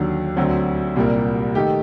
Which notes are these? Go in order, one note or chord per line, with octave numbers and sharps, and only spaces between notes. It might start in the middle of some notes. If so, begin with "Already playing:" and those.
Already playing: D#2 D3 F#3
D2 D3 F#3 C4
C2 A#2 G3 A#3
D#3 A3 D#4 G4